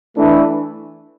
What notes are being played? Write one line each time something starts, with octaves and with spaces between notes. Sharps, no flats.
E3 A3 D4